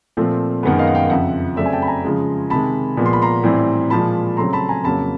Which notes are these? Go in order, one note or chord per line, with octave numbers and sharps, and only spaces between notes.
A#2 F3 A3 C4
F#2 D#3 G#3 B3 F#5
D#5 F5
F#5
F5 G5
F2 C#3 F3 E5 F#5
C#3 F#3 A3 C4 D5 E5
G#5
G5 A5
B5
G#5 A#5
C#3 F3 G#3
C3 D#3 G#3 A5 B5
A#2 F3 G#3 B3
C6
B5
A#5 C6
A2 E3 G3 C4
A#2 F3 G#3 A5 B5
C#3 F#3 A3 C4 A#5 C6
A5 B5
G#5 A#5
F2 C#3 F#3 A#3 A5 B5